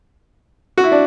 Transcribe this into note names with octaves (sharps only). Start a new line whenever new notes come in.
F#4
E4
D4